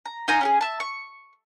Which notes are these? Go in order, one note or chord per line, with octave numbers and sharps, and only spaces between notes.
A#5
D#4 F4 G#5 A#5
C#4 G4 G#4
E5 A5
C#6